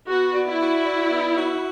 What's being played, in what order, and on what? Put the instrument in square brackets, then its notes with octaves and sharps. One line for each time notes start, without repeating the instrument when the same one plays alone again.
[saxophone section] B3 [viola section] F#4
[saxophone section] D5
[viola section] E4
[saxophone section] F#4
D5
B3
F#4